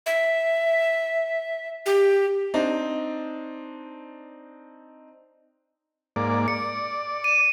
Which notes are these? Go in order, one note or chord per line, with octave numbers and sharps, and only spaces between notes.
E5
G4
C4 D4 D#4
G#2 A#3 D5
D5 C#7
D#7 E7